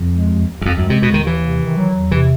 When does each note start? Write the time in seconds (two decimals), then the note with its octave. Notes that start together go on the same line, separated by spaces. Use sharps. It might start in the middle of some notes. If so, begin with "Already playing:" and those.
Already playing: F2
0.11 G#3
0.29 D#2
0.47 D#2
0.61 E2
0.66 F2 D#3
0.78 F#2
0.84 G#3
0.90 C3
1.01 D#2 B2
1.14 D#3
1.20 D#2
1.27 E3
1.39 C3
1.56 D#3
1.75 F#3
1.94 E2
2.11 C3 E3